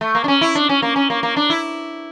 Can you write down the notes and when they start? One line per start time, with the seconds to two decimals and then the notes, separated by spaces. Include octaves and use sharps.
0.01 A3
0.15 A#3
0.24 D4
0.28 C#4
0.41 E4
0.55 D4
0.69 C#4
0.82 A#3
0.96 C#4
1.10 A#3
1.23 A#3
1.36 D4
1.50 E4